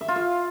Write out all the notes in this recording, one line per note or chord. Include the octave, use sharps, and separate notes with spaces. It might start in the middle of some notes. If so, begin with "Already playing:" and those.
E5
F4
F5